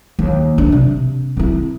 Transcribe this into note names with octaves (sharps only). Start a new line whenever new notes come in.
D#2
D4
C3
C4 E4